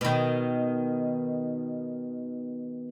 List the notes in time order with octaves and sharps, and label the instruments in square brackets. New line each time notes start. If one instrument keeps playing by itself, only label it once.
[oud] B2 D#3